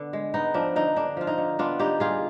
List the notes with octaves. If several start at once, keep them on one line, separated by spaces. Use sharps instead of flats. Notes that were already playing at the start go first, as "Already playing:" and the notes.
Already playing: D3 B3
G#3
B3 D#4
F3 D4
D3 D#4
D3 D4
F3 F4
D#4
D3
B3 D4 F4
D3 D#4 G4
G3 F4 G#4